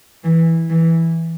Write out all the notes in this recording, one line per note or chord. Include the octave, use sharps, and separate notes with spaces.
E3
E3